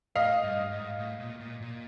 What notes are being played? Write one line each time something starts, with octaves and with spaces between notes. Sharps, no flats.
A2 D#5 F5
G2
G#2
A2
A#2
A#2
A#2